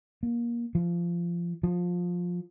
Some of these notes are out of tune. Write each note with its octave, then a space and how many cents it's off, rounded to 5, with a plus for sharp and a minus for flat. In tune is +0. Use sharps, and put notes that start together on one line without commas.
A#3 +20
F3 -20
F3 +15